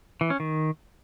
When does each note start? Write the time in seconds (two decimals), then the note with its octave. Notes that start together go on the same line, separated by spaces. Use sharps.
0.21 E3
0.30 C#4
0.40 D#3